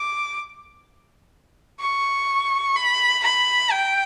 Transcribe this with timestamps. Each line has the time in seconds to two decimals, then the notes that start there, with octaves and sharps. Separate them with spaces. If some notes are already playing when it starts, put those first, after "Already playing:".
Already playing: D6
1.80 C#6
2.76 B5
3.24 B5
3.72 G5